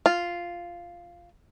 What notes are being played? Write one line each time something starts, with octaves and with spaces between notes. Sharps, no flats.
F4